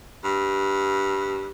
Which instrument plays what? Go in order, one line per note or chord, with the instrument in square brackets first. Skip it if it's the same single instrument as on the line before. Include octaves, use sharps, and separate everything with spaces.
[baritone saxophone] G2